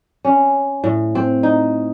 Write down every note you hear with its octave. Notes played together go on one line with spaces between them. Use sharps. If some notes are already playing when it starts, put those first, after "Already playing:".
C#4
A2
C4
D#4